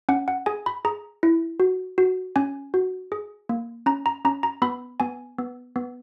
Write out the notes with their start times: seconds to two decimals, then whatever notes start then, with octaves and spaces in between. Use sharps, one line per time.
0.09 C#4 F#5
0.28 F#5
0.46 G#4 G#5
0.66 B5
0.85 G#4 A#5
1.23 E4
1.60 F#4
1.98 F#4
2.36 C#4 G#5
2.74 F#4
3.12 G#4
3.49 A#3
3.86 C#4 A#5
4.06 A#5
4.25 C#4 A#5
4.43 A#5
4.62 B3 B5
5.00 B3 G#5
5.38 B3
5.76 B3